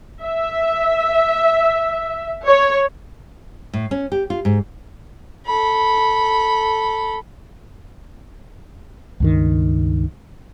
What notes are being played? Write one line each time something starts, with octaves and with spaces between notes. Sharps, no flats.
E5
C#5
A2
C#4
G4
F4
G#2
A4 B5
C#2 G2 D#3